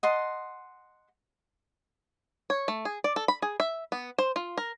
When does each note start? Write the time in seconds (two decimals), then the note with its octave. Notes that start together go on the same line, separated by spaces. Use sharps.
0.03 D#5 F#5 A5 C6
2.50 C#5
2.68 A3
2.85 G#4
3.04 D5
3.16 A4
3.28 B5
3.42 G#4
3.60 E5
3.92 B3
4.18 C5
4.36 F4
4.58 A#4